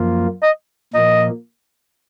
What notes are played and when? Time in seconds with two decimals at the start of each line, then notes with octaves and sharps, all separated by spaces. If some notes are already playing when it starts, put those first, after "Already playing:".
Already playing: F#2 F3 A#3 F4
0.43 D#5
0.94 A#2 F3 A#3 D#5